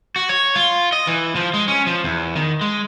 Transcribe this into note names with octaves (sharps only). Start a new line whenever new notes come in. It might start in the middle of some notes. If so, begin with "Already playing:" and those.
F#4
C#5
F4
D#5
E3
F3
G#3
C#4
F3
E2
D#3
G#3